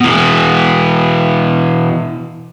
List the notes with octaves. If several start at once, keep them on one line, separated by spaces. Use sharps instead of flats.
B2 E3